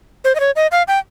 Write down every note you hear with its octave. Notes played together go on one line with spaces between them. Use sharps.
C5
D#5
C#5
D#5
F5
G5